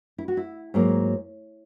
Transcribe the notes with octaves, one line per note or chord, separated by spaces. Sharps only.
E4
F#4
E4
G#2 F#3 A#3